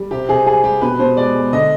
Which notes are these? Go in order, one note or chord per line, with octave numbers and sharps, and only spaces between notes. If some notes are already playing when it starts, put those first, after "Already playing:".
Already playing: G3
C3 G4
C3 G#4
G3 G#4
G3 G4
B2 B4
B2 C5
G#3 D5
G#3
D3 D#5